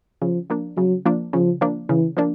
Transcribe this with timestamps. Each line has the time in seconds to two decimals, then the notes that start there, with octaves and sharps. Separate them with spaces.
0.21 C#3 F3
0.50 F3 A#3 D4
0.77 C#3 F#3
1.06 F3 A#3 D4
1.33 C#3 F3
1.61 F3 A#3 D4
1.89 C#3 E3
2.17 F3 A#3 D4